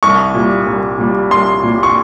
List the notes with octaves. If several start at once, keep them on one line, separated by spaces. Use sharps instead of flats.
C2 C#6
A#2 G3
C2
A#2 G3
C2 C6
A#2 G3
C#6